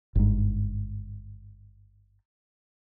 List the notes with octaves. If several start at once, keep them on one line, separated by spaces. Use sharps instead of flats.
G1 G#2